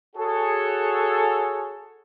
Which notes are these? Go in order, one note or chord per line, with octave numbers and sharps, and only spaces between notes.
F#4 G#4 A4 C#5